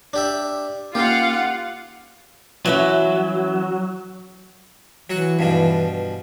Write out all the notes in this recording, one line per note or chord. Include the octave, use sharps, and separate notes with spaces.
D4 G4 E5
A#3 C#4 D#4 F4 G4 F5 F#5
E3 F#3 C#4 E5
E3 F#3 F#4 F#5
G2 B2 F3